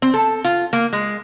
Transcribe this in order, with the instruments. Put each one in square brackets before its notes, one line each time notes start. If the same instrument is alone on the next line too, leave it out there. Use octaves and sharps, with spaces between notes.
[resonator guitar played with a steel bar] C4
A4
F4
A#3
G#3